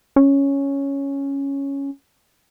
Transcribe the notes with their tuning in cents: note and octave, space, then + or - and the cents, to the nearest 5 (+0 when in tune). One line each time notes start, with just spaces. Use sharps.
C#4 +0